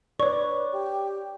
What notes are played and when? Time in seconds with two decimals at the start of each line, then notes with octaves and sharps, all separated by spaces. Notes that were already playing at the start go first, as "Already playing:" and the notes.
0.20 B4 C#5 D5 C#6
0.73 G4